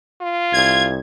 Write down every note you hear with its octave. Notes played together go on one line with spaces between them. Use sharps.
F4
C2 G#6